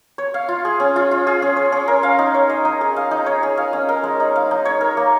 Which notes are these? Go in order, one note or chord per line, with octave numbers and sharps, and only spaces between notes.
C#5
F5
F4
G#4
C#4
F4
F4
G#4
C#4
C#5
C#4
A#4
F5
D#4
C#5
D#5
D#4
G#4
F5
D#4
C#5
G#4
F5
C#4
A#4
G#3
D#4
F5
D#4
C#5
A#4
A#3